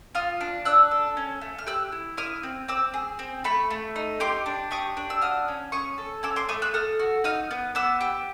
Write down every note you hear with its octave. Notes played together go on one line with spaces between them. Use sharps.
F4 D#6 F6
D4
D4 E6 F#6
A4
C#4
A3
F6
G4 E6 F#6
E4
E4 D#6 F6
C4
C4 D6 E6
G#4
C4
A3 B5 C#6
A3
D#4
G4 C6 D6
D4
G4 C#6 D#6
D4
E6
F#4 D#6 F6
C#4
C#4 C#6 D#6
A4
C#4 D6 E6
C6 D6
A3 C#6 D#6
E6 F#6
A4 D#6 F6
F#4
D#4 D#6 F6
B3
B3 D6 E6
G4